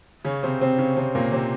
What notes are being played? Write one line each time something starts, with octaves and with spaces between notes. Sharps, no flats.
C#3 C#4
C3 C4
C3 C4
C#3 C#4
C3 C4
A#2 A#3
C3 C4